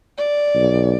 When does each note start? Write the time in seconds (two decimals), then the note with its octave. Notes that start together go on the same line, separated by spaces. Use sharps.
0.18 D5
0.55 B1